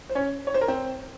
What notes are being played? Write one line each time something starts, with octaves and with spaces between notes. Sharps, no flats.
C5
C#4 C#5
C#5
C5
A#4
C4 C5